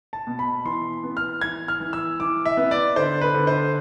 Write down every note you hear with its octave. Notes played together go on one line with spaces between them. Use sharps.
A5
B2
B5
E3 C6
B3
F6
E3 G#6
F6
E3
E6
E3 D6
E5
B3
D5
D3 C5
B4
D3
C5